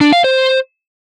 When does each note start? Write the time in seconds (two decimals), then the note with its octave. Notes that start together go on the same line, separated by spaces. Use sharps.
0.01 D4
0.13 F5
0.24 C5